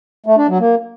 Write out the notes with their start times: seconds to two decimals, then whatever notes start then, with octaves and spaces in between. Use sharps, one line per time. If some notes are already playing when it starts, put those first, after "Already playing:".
0.26 A3
0.37 D4
0.48 F#3
0.60 A#3